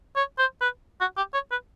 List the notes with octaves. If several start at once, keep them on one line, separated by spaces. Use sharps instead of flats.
C#5
C5
B4
F#4
G4
C#5
B4